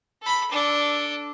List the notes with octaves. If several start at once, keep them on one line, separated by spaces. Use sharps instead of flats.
A4 B5
D4 A4